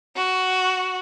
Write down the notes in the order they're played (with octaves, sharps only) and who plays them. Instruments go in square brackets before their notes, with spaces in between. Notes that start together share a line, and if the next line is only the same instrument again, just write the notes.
[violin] F#4